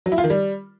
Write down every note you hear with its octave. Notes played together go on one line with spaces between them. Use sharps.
F#3
E4
F4
D#3
G3